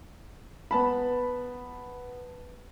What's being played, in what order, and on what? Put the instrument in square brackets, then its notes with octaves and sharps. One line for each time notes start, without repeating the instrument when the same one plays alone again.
[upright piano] B3 A5 B5